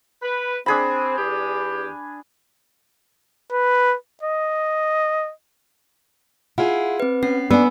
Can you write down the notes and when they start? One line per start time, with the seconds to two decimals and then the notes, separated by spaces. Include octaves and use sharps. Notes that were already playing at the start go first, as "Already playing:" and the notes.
0.22 B4
0.66 C4 D4 G#4 B5
1.17 E2 G4
3.52 B4
4.23 D#5
6.58 E4 F4 G#4 F#5
7.00 C4 B4
7.23 B3 C#4 C7
7.51 B3 D4 G#5 E6